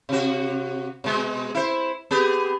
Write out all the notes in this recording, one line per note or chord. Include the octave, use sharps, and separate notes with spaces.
C3 F#4
B2 G#3
E4 C5
B3 G4 G#4